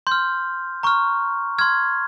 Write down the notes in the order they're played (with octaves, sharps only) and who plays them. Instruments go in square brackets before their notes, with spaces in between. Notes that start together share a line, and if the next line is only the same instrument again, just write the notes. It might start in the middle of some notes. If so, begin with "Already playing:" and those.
[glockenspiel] C6 F6 G6
A#5 C#6 F6
C6 F6 G#6